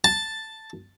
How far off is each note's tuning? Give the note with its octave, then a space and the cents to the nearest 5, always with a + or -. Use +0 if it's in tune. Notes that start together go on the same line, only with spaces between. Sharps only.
A5 +5